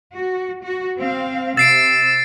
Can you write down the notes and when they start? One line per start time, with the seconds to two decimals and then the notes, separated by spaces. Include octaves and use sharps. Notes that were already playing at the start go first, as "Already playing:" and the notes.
0.15 F#4
0.62 F#4
0.98 C4 F5
1.57 C3 E6 A6 C7 D7